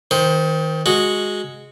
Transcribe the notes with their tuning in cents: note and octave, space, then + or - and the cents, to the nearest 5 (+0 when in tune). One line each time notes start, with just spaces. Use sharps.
D#3 +30 C5 +0
G#3 +0 F#4 -5